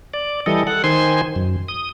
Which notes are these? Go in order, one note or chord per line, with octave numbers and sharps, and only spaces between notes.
D5
E3 G3 A4 D#5
A4 F#5
D#3 C5 G#5 C6
F#2
D#6